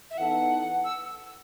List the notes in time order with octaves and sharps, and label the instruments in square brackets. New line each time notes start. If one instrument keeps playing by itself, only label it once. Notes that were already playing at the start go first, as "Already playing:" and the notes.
[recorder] E5
[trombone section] E3 B3 D#4 A4 [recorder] F#5
[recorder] E6